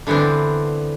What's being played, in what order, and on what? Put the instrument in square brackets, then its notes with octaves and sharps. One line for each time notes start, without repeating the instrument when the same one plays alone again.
[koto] D3 E3 B3 C4 D4